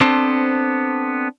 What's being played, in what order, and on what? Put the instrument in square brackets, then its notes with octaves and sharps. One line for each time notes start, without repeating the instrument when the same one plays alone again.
[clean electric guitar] B3 C4 D4 A4 C5